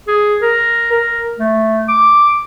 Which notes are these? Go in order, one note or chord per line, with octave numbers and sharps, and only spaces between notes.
G#4
A#4
A#4
A3
D6